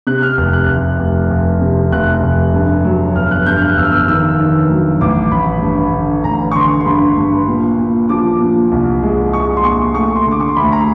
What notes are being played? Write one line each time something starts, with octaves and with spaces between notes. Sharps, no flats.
C3 F#6
F6
F1
F#6
F1
F1
F1
C3
F1 F#6
F1
G2
F#3
G1 F6
F#6
G2 G6
F6
F#6
G1 E6
F6
E6
D#3 E6
D#3
F#3
A1 D6
A1 B5
G2
D3
A1 A#5
C#6
D3 C6
C6
G2 B5
G2
A#2
A#2
F3 D6
A#2
C2
G#3
G#3 C#6
C6
A#2 C#6
A3 C#6
C6
D3
D6
C#6
C6
D2 B5
A#5